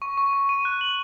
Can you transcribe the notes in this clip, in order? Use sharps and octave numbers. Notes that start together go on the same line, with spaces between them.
C#6
C#6
C#6
D#7
F#6
F#7